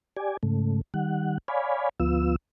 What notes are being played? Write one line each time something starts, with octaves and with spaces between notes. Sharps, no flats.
G4 D5 G#5
G#2 C#3 A3
D#3 G3 F#5
C#5 D5 F5 G#5 B5
D2 F3 B3 F4 E6